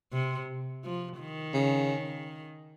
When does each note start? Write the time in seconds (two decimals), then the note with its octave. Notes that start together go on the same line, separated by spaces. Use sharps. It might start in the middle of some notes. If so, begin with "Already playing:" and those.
0.13 C3
0.84 F3
1.19 D#3
1.54 C#3